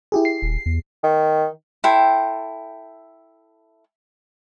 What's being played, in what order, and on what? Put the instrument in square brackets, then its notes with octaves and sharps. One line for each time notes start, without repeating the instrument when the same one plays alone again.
[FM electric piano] E4 G4 G#4
C7
[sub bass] D#1
E2
[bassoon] D#3
[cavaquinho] E4 A4 G5 C6